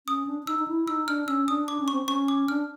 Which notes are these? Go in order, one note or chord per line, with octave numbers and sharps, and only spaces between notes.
C#4 D#6
D4
D4
D#4 E6
D#4
E4
D#4 E6
D4 F6
C#4 E6
D4 D#6
D4 D6
C#4
C#6
C4
C#4 C#6
D6
D4 F6